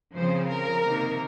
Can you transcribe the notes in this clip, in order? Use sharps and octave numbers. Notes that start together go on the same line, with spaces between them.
C#3 F3 C4 C5
A#4
C3 D#3 A#3 D#4